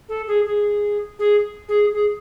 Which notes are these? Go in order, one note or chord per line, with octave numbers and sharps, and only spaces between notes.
A4
G#4
G#4
G#4
G#4
G#4